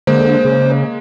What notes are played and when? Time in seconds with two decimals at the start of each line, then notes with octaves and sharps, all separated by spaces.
0.07 D3 G#3 A#3 C5
0.45 C#3